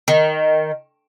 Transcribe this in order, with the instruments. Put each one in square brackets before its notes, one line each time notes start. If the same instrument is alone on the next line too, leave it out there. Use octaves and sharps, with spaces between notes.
[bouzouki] D#3